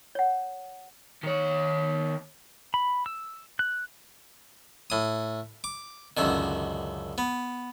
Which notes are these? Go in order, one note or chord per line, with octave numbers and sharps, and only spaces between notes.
C#5 F#5
D#3 C#5
B5
E6
F#6
A2 D#6
D6
C#2 F#2 D3 D#3
B3